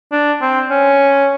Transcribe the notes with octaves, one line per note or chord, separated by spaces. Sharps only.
D4
C4
C#4